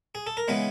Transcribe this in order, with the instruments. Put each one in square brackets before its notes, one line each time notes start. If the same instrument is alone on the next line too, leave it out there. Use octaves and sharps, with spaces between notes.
[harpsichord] G#4
A4
A#4
C#3 E3 G#3 B3 B4